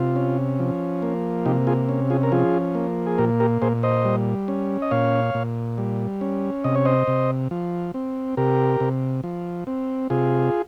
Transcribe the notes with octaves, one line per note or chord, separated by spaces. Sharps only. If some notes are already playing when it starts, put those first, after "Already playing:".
Already playing: C3 F4
C#4
F3
A#3
C3 D#4 G4
F4 G#4
C#4
F4 G#4
A#4
F3 F4 G#4
A#3
G#4
A#2 G4 A#4
G4 A#4
A#2 G#4 C5
C5 D#5
G3
C#4
D#5
A#2 C#5 F5
A#2
G3
C#4
C3 D#5
C#5
C5 D#5
C3
F3
C4
C3 G4 A#4
C3
F3
C4
C3 F4 G#4